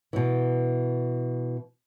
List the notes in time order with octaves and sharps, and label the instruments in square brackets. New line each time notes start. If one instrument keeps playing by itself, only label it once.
[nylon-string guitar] B2 E3